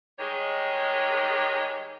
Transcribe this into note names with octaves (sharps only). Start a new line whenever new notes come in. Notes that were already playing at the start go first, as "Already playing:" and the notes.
D#3 G3 G#3 G#4 C#5